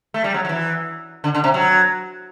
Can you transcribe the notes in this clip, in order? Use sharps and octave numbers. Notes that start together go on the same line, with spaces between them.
A3
G3
F#3
F#3
E3
D3
D3
C3
F#3